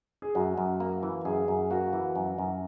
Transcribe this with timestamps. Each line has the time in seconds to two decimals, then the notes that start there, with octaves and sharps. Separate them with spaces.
0.22 G#4
0.35 F#2 F#4
0.58 F#2
0.80 A#3
1.03 E3
1.25 F#2 G#4
1.48 F#2
1.71 A#3 F#4
1.93 E3
2.16 F#2
2.38 F#2